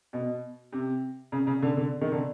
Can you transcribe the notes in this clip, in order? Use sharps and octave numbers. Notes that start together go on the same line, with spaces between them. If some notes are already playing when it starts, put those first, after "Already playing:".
B2
C3
C#3
C#3
D3
D3
D#3
D3